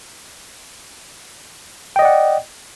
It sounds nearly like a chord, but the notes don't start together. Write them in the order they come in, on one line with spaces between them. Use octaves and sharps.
G5 D#5 D5 F#5